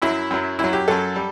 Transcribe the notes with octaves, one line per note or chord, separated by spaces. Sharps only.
F#2 F#3 E4
F#2 F#3
F#2 F#3 E4
G4
F#2 F#3 A4
G3